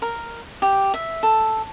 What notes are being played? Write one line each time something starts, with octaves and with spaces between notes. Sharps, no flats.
A#4
G4
E5
A4